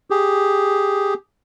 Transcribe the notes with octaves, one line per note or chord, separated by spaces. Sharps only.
G4 G#4